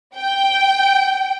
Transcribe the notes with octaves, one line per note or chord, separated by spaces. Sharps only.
G5